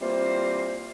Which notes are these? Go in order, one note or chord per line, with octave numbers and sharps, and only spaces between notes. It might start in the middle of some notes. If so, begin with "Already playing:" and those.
E3 G3 A#3 C4 F4 C5